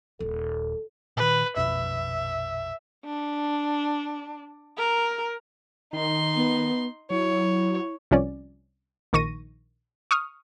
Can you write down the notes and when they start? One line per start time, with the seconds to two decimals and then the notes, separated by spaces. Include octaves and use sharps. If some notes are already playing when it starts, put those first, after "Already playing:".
0.20 D#1 A4
1.17 A#2 D#3 B4
1.56 A#1 F2 B2 E5
3.05 D4
4.78 A#4
5.93 D#3 D#4 C6
6.36 B3
7.10 F#3 E4 C#5
8.11 C2 F3 C#4 D5
9.13 A#1 D#3 C#6 A#6 D#7
10.11 C#6 D#6 F6